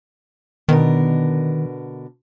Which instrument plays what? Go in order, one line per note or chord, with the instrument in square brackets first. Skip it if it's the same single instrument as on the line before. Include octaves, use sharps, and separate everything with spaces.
[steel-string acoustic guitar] B2 D3 A#4 [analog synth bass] D#3